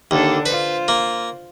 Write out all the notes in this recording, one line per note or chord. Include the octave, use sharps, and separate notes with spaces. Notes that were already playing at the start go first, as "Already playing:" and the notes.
D#2 D3 D4 A4
F4 B4 C5
A#3